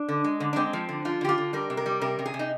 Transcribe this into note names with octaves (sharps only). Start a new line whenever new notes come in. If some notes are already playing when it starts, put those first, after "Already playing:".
Already playing: D4
D3
G#3
D3
D4
G#3 C4
F3
D3
F3 F4
D3 G4
F4
D3
G3 A#4
C3
A#4
G3
C3 A#4
C3
G#4
C3
D#4